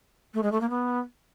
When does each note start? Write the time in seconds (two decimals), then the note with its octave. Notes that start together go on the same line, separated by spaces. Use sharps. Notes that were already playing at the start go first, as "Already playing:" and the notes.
0.34 A3
0.43 G#3
0.52 A3
0.61 A#3
0.70 B3